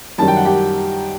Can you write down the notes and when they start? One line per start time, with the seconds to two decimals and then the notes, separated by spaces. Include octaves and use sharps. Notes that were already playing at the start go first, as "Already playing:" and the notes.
0.18 F#2 D#3 G3 A5
0.28 G5
0.36 F#5
0.45 G4 G5